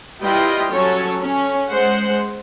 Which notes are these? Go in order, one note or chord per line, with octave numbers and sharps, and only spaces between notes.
G3 E4 F4 B4 D#5 G5
F#3 C#4 A4 C#5
C#4
G#3 C5 F#5